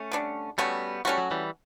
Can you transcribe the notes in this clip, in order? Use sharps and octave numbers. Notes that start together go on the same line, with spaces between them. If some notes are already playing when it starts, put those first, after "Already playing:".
Already playing: A3 C#4
D3 G3 D4
G3 A3 B3 C#4 F#4
G3 A3 C#4 F#4
F#3
E3 G3